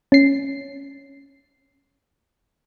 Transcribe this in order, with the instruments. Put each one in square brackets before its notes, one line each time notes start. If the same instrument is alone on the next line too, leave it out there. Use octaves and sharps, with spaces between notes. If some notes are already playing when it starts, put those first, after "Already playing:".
[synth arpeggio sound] C#4 C7